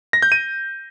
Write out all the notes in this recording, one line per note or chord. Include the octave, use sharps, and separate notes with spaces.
A#6
G6
D#7